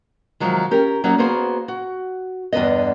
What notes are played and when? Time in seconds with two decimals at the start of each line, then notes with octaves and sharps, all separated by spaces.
0.40 C3 D#3 F3 F#3 G#3
0.71 C#4 G4 A#4
1.04 F#3 A#3 C#4 D#4 F#4
1.18 A#3 B3 F#4 G#4 C5
1.68 F#4
2.52 E2 G2 D3 B3 D#5